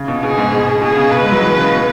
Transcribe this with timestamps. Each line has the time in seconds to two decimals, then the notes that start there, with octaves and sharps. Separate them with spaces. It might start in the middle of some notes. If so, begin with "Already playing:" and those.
Already playing: C#3
0.08 B2
0.22 B2 G#4
0.38 G#2
0.53 B2
0.67 B2
0.82 B2 G#4
0.97 C#3
1.12 B2 B4
1.22 G#3
1.32 F#3
1.41 E3
1.56 C#3
1.71 B2